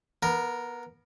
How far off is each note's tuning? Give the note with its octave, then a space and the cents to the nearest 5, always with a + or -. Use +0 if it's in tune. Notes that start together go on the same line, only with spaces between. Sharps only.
B3 -25 A#4 +0